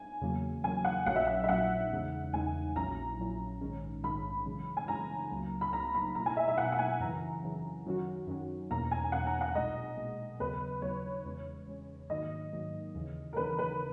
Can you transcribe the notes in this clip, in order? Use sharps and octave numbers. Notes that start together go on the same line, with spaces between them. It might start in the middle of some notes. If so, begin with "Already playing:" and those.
Already playing: G#5
E2 C#3 F#3 A#3
E2 C#3 F#3 A#3 G#5
F#5
A#1 A#2 F#3 C#4 F#5
E5
F#5
E5
A#1 A#2 F#3 C#4 F#5
E2 C#3 G#3 D#4
E2 C#3 G#3 D#4 G#5
A#1 A#2 F#3 C#4 E4 A#5
A#1 A#2 F#3 C#4 E4
A#1 G#2 D#3 G#3 C#4
A#1 G#2 D#3 G#3 C#4 B5
F#2 C#3 E3 G#3 C#4
G#5
F#2 C#3 E3 G#3 C#4 A#5
C#2 C#3 F#3 A#3
B5
C#2 C#3 F#3 A#3 A#5
B5
B2 A#3 E4 A#5
G#5
E5
E5
B2 A#3 E4 F#5
F#5
G#5
F#2 C#3 E3 A#5
F#2 C#3 E3
F#2 D#3 F#3 C#4 F#4
F#2 D#3 F#3 C#4 F#4
E2 B2 A#3 C#4 A#5
G#5
E2 B2 A#3 C#4 F#5
A#5
F#5
B1 A#2 G#3 D#5
B1 A#2 G#3
D#2 C#3 F#3 B3 B4
D#2 C#3 F#3 B3 C#5
E2 C#3 G#3 C#4
E2 C#3 G#3 C#4
G#2 D#3 F#3 A#3 D#5
G#2 D#3 F#3 A#3
D#2 C#3 E3
A#4
D#2 C#3 E3 B4
B4